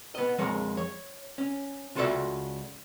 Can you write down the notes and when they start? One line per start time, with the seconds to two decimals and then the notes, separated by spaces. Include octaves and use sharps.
0.15 B3 D#5
0.38 F2 F3 G#3 A#4 C#5
0.77 C#5
1.38 C#4
1.95 C#2 F4 F#4 A4 D5 E5